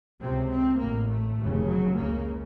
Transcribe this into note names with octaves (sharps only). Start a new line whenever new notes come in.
C#2 C3 C4
C4
A1 A2 A#3
A3
F1 D#2 C#3
F#3
C#2 C#3 A#3